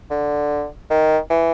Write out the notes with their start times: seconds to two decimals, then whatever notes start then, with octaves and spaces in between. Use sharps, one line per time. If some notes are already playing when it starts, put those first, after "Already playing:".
0.11 D3
0.90 D#3
1.30 E3